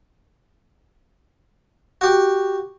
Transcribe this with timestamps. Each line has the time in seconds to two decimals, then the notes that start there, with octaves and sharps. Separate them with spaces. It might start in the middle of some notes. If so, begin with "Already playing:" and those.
2.01 F#4 G4